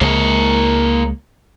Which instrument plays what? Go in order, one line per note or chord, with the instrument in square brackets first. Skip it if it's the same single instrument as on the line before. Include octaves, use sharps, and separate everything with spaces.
[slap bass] C#2 G#3 [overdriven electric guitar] A#3 C#5